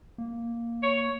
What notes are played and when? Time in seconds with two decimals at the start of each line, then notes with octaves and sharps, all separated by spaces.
0.18 A#3
0.83 C#5